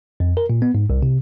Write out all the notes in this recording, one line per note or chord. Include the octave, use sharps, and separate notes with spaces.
F2
A#4
A#2
B3
G#2
C2
C3